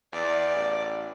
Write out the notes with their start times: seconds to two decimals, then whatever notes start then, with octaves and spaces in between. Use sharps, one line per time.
0.13 E2 D5
0.55 A1